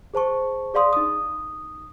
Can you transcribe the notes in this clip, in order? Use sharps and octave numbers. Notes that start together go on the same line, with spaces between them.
G#4 C5 A5 C#6
G#4 D5 F5 C6 D#6
D#4 D#6